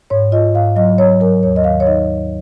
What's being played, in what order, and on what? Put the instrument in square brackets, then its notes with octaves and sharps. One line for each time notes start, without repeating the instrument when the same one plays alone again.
[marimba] G#2 C#5
F4 D#5
G#2 F5
F#3 D#5
F#3 C#5
F#3 A#4
D#2 C#5
D#5
D#3 F5
C#5
D#4 D#5